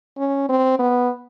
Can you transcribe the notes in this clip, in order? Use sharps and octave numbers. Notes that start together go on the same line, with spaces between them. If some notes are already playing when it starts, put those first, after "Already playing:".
C#4
C4
B3